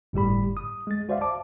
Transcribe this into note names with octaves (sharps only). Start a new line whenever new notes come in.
G1 A2 G3 G4 B5
D#6
G#3 A6
F#4 C5 D5 E5 F5
A5 D6